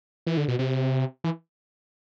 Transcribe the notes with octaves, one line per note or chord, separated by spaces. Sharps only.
E3
D3
B2
C3
E3